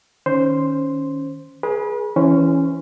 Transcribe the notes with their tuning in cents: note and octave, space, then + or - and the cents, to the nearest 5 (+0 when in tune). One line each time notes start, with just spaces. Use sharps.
D#3 +0 C#4 +0 C5 +0
G#4 +10 B4 -35
E3 +0 C#4 +0 C5 -30